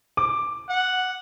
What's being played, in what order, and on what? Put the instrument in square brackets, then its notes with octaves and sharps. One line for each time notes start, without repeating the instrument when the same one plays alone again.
[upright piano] D6
[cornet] F#5